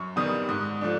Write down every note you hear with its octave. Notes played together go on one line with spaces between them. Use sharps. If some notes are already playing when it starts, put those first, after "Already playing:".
Already playing: F#2 C#6
D#3 G3 B3 D#6
G#2 D#6
F3 A3 D4